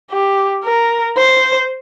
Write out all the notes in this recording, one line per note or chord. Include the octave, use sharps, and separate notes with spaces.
G4
A#4
C5